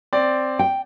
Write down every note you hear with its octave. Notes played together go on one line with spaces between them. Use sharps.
C4 D5
G5